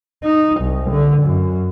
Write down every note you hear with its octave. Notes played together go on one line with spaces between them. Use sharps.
D#4
C2
D3
F#2